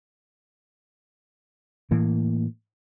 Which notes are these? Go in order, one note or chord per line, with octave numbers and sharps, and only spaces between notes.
A2 E3 A#3